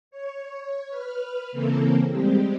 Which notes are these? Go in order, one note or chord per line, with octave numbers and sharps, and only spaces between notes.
C#5
B4 F6
C#3 E3 A#3 C4 A4 A#4
G3 G#3 C4 G4